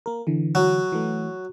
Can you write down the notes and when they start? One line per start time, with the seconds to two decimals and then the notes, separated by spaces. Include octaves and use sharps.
0.06 A#3 A#4
0.27 D3 E3
0.55 F#3
0.92 E3 A3